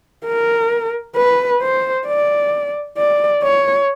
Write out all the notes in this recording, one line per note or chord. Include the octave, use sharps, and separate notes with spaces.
A#4
B4
C5
D5
D5
C#5